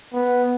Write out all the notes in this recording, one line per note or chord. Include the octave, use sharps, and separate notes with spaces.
B3